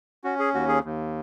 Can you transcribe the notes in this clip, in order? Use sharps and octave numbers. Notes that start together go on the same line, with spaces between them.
C#4 F#4
G#4
D#2 F#4
G#4
D#2